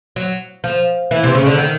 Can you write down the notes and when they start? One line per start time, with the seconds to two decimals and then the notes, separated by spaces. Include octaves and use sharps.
0.16 F#3
0.64 F3
1.11 E3
1.24 C3
1.35 C#3
1.46 D3
1.58 D#3